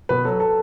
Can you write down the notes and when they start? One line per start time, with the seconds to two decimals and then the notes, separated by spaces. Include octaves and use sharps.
0.09 B2 B4
0.25 F#3 A4
0.40 A4